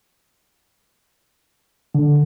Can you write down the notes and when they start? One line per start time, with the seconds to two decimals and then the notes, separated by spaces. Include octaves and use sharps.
1.95 D3